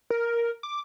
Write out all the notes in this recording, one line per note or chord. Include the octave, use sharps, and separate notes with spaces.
A#4
D6